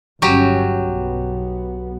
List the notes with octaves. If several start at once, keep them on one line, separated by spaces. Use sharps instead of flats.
G1 F#3 C#4 F#4 G4
B1 B3